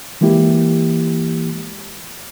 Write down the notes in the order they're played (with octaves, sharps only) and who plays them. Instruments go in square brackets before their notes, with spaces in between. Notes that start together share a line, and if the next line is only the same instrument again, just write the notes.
[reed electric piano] E3 G#3 A#3 E4 G4